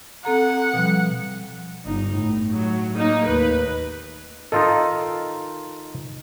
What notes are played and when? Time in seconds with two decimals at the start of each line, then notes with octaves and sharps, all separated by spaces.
0.25 C4 A4 F#5 A#5
0.74 B2 F3 G3
1.85 G1 D#4
2.16 A2
2.52 F#3
2.97 A#3 D#4
3.27 D#2 B4
4.52 D#3 D#4 F4 A4